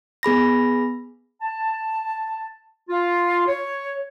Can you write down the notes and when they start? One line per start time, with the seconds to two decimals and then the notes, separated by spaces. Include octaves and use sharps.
0.23 B3 G#4 B5 A#6
1.41 A5
2.89 F4
3.47 C#5